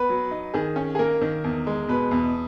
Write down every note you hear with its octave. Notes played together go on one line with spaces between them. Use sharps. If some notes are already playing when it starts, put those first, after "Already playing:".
Already playing: B3 B4
F#3
D#4
D#3 G#4
C#4
G#4
A#3 A#4
D#3
E2
G#3
B2 B4
E2